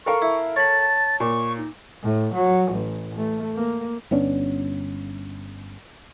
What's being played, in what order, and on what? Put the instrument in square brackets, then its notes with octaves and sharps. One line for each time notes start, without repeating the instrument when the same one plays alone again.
[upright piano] A4 A#4 F5 [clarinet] C#6
[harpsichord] E4
[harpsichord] C#5 B5 [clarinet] A5 [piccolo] A6
[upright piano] A#2 [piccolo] C#6
[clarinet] D#4
[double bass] A2
F#3
A1
A3
A#3
[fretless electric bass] G1 B3 C#4 D4